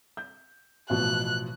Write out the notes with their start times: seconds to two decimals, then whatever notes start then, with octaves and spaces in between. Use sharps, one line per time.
0.17 G6
0.90 A1 B2 F3 F#6